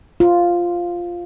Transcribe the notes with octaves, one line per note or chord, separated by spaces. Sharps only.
F4